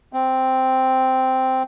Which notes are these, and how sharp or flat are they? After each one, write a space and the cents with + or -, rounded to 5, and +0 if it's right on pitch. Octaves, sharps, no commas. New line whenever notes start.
C4 -5